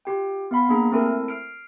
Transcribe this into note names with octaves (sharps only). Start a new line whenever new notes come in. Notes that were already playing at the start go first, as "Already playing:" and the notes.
F4 G4 G5
B3 F5 B5 C6
A#3 D4 G#4 A#5
A3 C4 E4 A4 A#4
F6 C7 D7